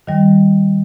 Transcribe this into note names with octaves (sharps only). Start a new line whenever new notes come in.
D#3 G3